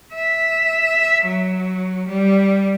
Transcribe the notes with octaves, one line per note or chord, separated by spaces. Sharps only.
E5
F#3
G3